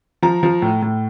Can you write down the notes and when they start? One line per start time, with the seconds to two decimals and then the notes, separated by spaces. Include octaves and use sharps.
0.22 F3 A#5
0.43 F3
0.62 A2
0.82 A2